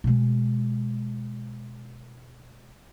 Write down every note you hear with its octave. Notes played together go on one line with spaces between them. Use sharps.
B2 G#3